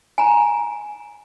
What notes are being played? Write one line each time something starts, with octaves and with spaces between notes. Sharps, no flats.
G#5 A#5